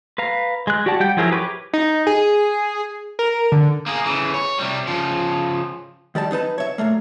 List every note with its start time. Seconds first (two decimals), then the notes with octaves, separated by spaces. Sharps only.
0.18 B4 F5 A#5
0.67 G#3 F#6
0.86 F#4 G4 D5 F#5 A5
1.00 G3 F#5 G5 G6
1.17 F3 F#3 E4 G#4 A#4
1.31 G4 B4 C#5 A#5 D6
1.73 D#4
2.07 G#4
3.19 A#4
3.52 D3
3.86 A#3 G#4
4.05 C#3 E3
4.34 C#5
4.59 C3 G3
4.87 C#3 F3
6.15 D#3 G3 D5 A5
6.31 F#3 D#4 B4 A5
6.58 C#5 E5
6.78 A#2 F#3 A3 A#3